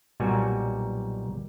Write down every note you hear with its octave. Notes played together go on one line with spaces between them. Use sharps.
B1 A#2 G3 F#4 G#5